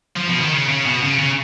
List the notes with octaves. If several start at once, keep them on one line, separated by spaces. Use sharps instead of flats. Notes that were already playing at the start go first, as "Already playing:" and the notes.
F3
B2
D#3
C#3
C#3
B2
C#3
C#3